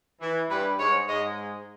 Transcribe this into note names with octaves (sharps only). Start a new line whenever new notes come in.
E3
G2 G3 B4
G#2 G#3 C#5
G#2 G#3 D#5